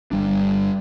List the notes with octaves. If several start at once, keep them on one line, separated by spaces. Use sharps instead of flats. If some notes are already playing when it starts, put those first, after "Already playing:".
G1 G3 D4